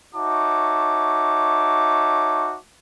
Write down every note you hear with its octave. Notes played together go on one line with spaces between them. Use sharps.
D#4 F#4 C#5 E5 A5 D6